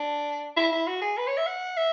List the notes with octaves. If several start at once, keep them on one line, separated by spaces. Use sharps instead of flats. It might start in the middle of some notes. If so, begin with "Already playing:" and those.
Already playing: D4
E4
E4
F#4
G#4
B4
C#5
E5
F#5
E5